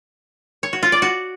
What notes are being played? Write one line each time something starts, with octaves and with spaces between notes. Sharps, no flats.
C#5
F#4
F4
D5
F#4